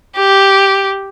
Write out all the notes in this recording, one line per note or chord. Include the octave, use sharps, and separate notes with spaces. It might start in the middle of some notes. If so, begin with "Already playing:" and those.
G4